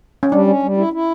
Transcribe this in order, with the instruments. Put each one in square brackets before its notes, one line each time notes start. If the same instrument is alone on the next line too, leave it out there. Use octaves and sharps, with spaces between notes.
[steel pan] C#4
[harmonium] G3 [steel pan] D4
[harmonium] C#4
G3
E4
E4